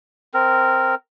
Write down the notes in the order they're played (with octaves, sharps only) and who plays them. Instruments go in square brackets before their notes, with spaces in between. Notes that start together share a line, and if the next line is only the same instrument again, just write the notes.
[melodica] C4 A#4